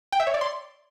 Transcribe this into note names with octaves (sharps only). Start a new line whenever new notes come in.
G5
E5
C#5
D5
C6